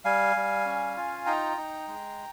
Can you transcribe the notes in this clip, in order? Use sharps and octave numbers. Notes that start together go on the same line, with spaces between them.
G3 F5 G#5
G3
C#4
F4
D#4 G5 A#5
D#4
G#3